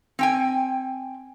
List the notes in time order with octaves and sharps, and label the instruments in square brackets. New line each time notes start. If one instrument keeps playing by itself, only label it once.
[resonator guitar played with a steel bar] C4 G5 G#5